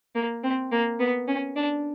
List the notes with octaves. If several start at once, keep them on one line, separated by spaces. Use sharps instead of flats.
A#3
C4
A#3
B3
C#4
D4